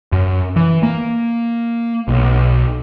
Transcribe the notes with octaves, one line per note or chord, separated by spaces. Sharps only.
F#2
E3
A#3
B1